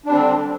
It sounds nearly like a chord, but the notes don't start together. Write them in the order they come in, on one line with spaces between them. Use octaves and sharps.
D4 G3 C4 D3